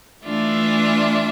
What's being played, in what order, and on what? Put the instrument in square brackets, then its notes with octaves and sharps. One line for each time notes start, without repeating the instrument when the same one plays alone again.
[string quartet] E3 A3 D4 F4 E5